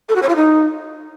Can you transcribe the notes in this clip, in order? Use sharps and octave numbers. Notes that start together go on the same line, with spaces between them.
A4
F#4
C#5
F4
D#4